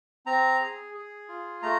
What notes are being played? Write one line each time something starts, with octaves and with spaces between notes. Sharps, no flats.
C4 A#5
G#4
G#4
F4
A3 A#5